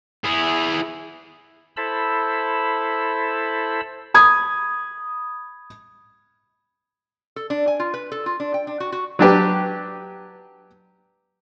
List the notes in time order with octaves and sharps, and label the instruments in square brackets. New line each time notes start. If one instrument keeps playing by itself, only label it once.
[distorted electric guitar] E4 G#4
[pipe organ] E4 A4 C5 A5 B5 E6
[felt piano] B5 D#6 G#6
[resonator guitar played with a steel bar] A4
D4
G#5
F4
B4
A4
F4
D4
G5
D4
F#4
F#4
[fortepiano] F#3 D4 G4 B4